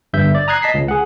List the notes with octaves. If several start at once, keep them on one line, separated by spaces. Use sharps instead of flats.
G1 G2 E5 G6
D5
A#5 D#6 F#6 G#6 C7
D#5 A5 B6 C7
C#2
G#4 F#5